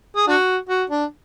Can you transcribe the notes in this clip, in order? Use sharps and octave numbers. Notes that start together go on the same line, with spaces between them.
G#4
D4 F#4
F#4
D4